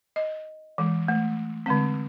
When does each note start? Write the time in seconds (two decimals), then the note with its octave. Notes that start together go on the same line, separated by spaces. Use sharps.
0.16 D#5
0.78 E3 G#3
1.08 A3
1.66 D3 G#3 C4